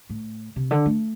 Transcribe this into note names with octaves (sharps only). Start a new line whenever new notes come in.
A2
C3
D3
A3